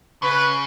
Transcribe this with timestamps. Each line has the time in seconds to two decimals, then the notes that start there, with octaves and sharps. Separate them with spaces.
0.22 C#3 B4